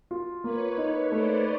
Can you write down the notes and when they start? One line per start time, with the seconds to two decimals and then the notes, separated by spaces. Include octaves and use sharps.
0.11 F4
0.44 A#3 B4 C#5
0.77 D#4
1.11 A3 C5 D5